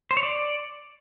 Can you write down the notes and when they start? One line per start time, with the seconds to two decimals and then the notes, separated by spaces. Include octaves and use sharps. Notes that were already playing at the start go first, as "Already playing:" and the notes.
0.11 C5
0.17 C#5
0.23 D5